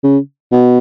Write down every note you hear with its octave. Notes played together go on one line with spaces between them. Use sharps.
C#3
B2